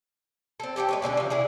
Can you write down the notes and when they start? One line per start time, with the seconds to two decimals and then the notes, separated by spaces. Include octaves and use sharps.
0.60 C4 A4
0.76 G4 A4 F5 G5
0.89 G#3 B4 C#5
1.02 B2 D3 C#4 D4
1.17 C3 F3
1.30 E4 G#4 D5